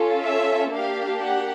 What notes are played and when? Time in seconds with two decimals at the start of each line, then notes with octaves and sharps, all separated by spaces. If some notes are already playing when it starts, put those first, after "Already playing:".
Already playing: C#4 F4 A4
0.22 E5
0.72 A#3 D4 G4 F5
1.23 F#5